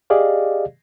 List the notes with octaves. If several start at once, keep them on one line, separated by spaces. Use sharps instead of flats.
G4 G#4 D5 D#5 F5